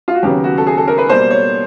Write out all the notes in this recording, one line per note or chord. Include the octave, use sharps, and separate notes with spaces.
F4
F#4
D#2 C#3 F#3 B3 G4
F#4
A4
G#4
A4
A#4
B4
B2 G3 A#3 C5
C#5